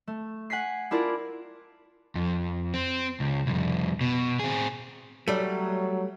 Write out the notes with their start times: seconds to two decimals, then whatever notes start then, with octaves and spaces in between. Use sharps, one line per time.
0.07 A3
0.50 F#5 G#5 B6 C7
0.91 D4 E4 F4 A#4 D5
2.15 F2
2.74 C4
3.20 C#2
3.47 C2 F2
4.01 B2
4.40 C4 G#4
5.28 F#3 G3 A3